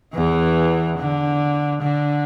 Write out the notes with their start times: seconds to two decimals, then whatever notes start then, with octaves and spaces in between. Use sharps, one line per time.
0.15 E2 E3
0.98 D3
1.81 D3